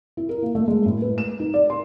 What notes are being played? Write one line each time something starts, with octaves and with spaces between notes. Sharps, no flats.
E4
A#4
A#3
A3
G#3
A2
B4
E7
D#4
D5
C6